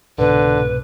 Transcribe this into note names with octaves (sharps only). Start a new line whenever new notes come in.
C2 G#2 B2 D3 B4